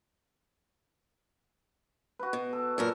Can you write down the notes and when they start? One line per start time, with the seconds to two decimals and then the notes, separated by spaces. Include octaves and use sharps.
2.19 F#4 B4
2.33 B2
2.53 A4
2.78 F#2 A#2 A#4 A5